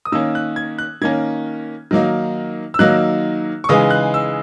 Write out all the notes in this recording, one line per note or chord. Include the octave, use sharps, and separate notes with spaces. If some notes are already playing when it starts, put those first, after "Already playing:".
D#6
D#3 A#3 C#4 E6
F#6
G#6
F#6
D#3 A#3 C#4 G#6
D#3 F#3 A#3 D#4
E6
D#3 F#3 A#3 D#4 F#6
C#6
C#3 E3 G#3 D#4 D#6
F#6
E6